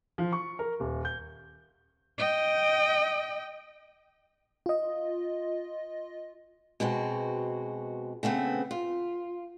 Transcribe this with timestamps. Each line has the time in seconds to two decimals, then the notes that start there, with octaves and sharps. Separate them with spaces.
0.18 F3
0.32 C#6
0.59 A#4
0.80 D#1
1.05 G6
2.18 D#5 G5
4.66 F4 D#5
6.80 B2 G#3 C4 F#4
8.23 C#3 A3 B3 C4
8.71 F4